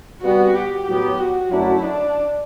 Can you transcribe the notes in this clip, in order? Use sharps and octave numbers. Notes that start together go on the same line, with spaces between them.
C3 G3 B3 F#4
G4
A2 F#3 B3 G4
F#4
F#2 F#3 A3 D4 E4
D4